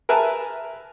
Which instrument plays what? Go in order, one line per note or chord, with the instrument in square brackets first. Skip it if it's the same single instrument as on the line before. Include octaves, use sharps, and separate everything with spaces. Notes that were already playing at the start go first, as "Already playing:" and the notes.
[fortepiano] A#4 B4 E5 G#5 A5